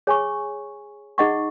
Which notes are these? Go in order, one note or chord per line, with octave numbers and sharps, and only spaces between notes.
G#4 C#5 G#5 C#6
D#4 G#4 D#5 F#5 C#6